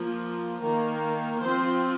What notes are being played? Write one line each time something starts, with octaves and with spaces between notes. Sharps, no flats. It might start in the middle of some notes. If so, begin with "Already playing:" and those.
Already playing: F3 A#3
D#3 A#3
F3 C4 C5